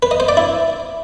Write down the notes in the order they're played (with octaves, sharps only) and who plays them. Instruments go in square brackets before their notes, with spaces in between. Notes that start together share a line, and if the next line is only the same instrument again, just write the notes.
[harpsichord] B4
D#5
C5
D5
E4